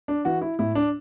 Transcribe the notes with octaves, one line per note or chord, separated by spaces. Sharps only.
D4
E3 F#4
E4
A2 E4
D4